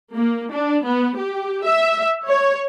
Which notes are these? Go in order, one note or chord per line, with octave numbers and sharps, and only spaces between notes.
A#3
D4
B3
G4
E5
C#5